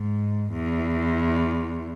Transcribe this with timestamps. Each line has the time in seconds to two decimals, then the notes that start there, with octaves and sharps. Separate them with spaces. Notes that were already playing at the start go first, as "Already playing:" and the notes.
Already playing: G#2
0.53 E2